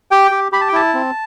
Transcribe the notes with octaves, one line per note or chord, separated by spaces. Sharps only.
G4 G5
G4
G4 B5
A5
G5
E4 A5
C4